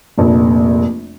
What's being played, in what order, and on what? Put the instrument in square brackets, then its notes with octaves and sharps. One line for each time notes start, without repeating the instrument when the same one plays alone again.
[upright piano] F1 A#1